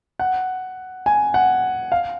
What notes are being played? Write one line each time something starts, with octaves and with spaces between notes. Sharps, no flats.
F#5
G#5
F#5
F5